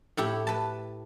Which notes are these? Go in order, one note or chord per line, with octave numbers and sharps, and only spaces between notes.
A2 E4 G4
B4 A5